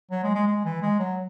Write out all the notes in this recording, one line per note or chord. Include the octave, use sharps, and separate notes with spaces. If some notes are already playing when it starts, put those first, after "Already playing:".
F#3
G#3
G#3
G#3
E3
G#3
F#3